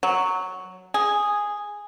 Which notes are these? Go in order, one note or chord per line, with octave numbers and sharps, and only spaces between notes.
F#3
G#4